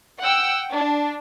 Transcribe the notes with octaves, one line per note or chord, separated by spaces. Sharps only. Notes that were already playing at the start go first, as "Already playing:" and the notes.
F#5 G5 E6
D4